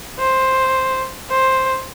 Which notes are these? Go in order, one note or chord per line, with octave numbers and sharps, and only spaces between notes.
C5
C5